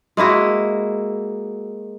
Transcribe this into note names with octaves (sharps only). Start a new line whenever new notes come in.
G#3 A#3 E4 F#4